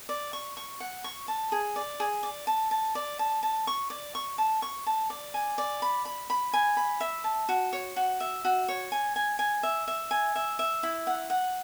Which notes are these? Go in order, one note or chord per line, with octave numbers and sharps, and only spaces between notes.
D5
C#6
C#6
F#5
C#6
A5
G#4
D5
G#4
D5
A5
A5
D5
A5
A5
C#6
D5
C#6
A5
C#6
A5
D5
G#5
D5
B5
B5
B5
G#5
B5
E5
A5
F#4
C#5
F#4
E5
F#4
C#5
G#5
G#5
G#5
E5
E5
G#5
E5
E5
E4
F#5
F#5